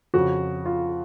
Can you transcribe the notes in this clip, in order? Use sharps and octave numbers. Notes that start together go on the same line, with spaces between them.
F2 C#3 F#4
F4